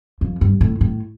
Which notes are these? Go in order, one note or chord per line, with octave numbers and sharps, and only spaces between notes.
F2
G2
A2
A2